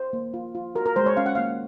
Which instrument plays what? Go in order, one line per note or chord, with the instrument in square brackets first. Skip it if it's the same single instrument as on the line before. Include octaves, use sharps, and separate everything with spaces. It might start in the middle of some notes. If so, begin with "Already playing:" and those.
Already playing: [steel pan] C5
A#3
F4
F4
F#4 A#4
A#4
G#3 C5
C#5
C#4 F5
F#5
A#3 F5